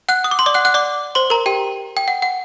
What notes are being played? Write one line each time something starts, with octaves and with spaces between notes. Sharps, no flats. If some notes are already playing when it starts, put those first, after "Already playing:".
F#5 F#6
D#6
D6
C6
D5 D6
F#5 F#6
F#5 F#6
D5 D6
C5 C6
A#4 A#5
G4 G5
G5
F#5
F#5